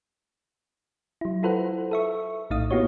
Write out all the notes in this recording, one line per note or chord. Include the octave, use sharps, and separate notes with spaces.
F#3 E4
E4 F4 A4 B4 C5 F#5
A4 E5 C#6
A#1 A2 D#4 D#5 F5 D#6
A#3 B3 E4 F#4 G4 C#5